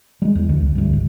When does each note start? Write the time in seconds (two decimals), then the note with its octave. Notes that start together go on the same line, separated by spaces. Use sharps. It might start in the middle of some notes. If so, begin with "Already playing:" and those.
0.22 G3 G#3
0.35 E2
0.49 D2
0.61 C#2
0.75 D2 G2
0.93 G#1